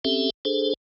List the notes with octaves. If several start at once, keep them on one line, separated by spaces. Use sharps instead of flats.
C4 C#4 G4 A4 E5
D4 G#4 A4 C5